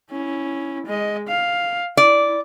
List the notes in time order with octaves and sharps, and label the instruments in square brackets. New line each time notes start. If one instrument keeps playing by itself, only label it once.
[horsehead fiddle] C#4 E4
G#3 D#5
F5
[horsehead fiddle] E4 [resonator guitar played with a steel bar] D5